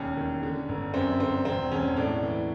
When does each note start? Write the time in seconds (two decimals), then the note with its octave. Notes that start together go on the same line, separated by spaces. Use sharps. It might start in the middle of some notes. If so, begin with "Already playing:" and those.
Already playing: E1 D#2 C#4
0.17 D#3
0.43 D3
0.69 G1
0.94 F#2 C4
1.19 D3 C4
1.45 E1 C4
1.71 E1 C#4
1.96 A2 D4
2.23 E3